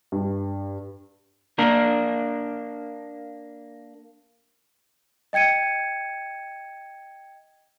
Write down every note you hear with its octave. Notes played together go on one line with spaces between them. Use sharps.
G2
A#3 D4 A#4
D#5 G5 G#6 C#7 D#7